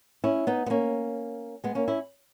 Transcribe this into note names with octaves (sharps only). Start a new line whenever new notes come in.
C#4 E4
B3 D#4
B3
A#3 C#4
G#3 B3
A#3 C#4
C#4 E4